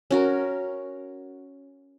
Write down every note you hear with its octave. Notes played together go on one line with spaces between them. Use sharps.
C#4 F#4 A#4